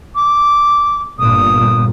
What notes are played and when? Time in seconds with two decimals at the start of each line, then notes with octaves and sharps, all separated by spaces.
0.15 D6
1.19 G1 A#2 D#6